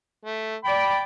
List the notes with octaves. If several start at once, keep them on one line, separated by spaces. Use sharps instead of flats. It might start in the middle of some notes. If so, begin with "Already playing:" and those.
A3
D5 G5 B5